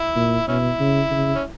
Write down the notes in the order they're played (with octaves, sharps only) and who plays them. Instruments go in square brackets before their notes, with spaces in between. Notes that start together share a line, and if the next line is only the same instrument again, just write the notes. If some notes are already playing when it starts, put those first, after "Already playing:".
Already playing: [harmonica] E4
[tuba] A#2
[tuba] B2 [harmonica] C#4 E4
[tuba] C#3
C#3
[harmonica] C#4